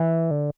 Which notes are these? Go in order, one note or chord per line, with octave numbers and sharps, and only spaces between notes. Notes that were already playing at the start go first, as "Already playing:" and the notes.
Already playing: E3
D3